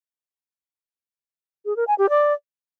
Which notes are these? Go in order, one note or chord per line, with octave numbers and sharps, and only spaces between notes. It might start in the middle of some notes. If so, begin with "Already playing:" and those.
G#4
A#4
G#5
G4
D5